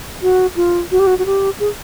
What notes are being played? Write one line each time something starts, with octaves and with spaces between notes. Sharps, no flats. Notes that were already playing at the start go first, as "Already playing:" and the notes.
F#4
F4
F#4
G4
F#4
F#4
G4
G#4